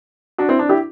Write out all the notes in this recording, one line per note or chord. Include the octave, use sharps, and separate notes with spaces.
D4 F#4
C4 E4
D4
E4 G4